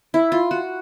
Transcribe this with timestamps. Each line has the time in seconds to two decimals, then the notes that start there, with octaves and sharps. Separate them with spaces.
0.14 E4
0.32 F4
0.51 F#4